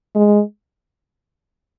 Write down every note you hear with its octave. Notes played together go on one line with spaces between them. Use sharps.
G#3